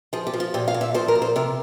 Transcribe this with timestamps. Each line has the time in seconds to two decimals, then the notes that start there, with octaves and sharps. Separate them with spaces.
0.13 F3 G#4
0.27 G4
0.34 F3
0.40 F4
0.54 A#2 G4
0.68 F5
0.74 A#2
0.81 E5
0.94 F3 C5
1.08 A#4
1.15 A#2
1.22 C5
1.36 C3 A#4